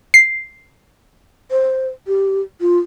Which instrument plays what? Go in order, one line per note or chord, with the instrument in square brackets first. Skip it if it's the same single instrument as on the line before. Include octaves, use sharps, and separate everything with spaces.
[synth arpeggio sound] C7
[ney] C5
G4
F4